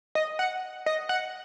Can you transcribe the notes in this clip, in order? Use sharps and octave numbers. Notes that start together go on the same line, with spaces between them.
D#5
F#5
D#5
F#5